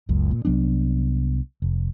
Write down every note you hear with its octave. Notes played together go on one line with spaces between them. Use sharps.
F#1 C#2 F#2
A#2
C2 F#3 B3 D4
F1